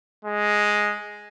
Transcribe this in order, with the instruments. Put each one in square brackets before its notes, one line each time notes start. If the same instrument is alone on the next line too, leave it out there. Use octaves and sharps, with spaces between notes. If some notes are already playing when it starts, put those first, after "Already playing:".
[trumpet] G#3